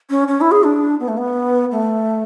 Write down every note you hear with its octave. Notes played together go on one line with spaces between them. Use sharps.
C#4
C#4
E4
G#4
D4
B3
A3
B3
A3